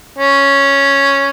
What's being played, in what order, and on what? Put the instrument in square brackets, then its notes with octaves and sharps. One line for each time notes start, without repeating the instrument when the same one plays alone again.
[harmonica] C#4